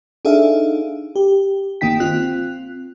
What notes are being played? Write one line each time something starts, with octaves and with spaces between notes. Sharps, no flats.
D4 D#4 G#4 A4 E5 F5
G4
G1 D#3 A#3 D#4 G5 B6
C4 F4 F#6